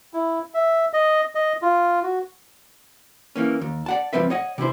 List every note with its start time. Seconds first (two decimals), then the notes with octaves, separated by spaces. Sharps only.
0.14 E4
0.54 E5
0.93 D#5
1.35 D#5
1.62 F4
2.03 F#4
3.36 E3 A#3 C#4
3.61 D#2
3.86 D5 F#5 A5
4.13 C#2 B2 F3 C4 B4 E5
4.30 C#5 D#5 F#5
4.58 C3 E3 E4 C5